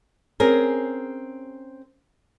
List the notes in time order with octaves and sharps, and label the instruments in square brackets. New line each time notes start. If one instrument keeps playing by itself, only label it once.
[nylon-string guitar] C4 C#4 G#4 A#4